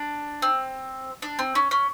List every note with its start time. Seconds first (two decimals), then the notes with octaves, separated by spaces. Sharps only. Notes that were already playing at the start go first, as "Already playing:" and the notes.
Already playing: D4
0.42 C4
1.22 D4
1.39 C4
1.55 C#4
1.71 C#4